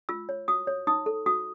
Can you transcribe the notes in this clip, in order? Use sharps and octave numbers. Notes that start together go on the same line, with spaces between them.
F4 E6
C#5
F#4 D#6
C#5
D#4 D#6
A4
F#4 D#6